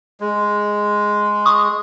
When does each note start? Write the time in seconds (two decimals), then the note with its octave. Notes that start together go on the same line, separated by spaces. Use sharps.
0.20 G#3
1.45 C#6 D#6